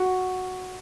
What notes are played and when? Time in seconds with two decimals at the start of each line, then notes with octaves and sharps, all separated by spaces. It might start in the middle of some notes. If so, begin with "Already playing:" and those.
Already playing: F#4